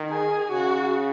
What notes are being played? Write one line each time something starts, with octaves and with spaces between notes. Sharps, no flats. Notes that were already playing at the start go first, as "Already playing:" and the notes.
Already playing: D#3
G#4
C#3 F#4